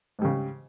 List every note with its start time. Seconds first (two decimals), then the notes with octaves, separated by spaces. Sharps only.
0.19 G#2
0.22 G3
0.25 C#3